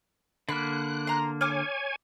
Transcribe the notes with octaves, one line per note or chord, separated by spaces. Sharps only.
D3 A#3 B5 F#6
A#5 C6
C#5 G#5 D6 F6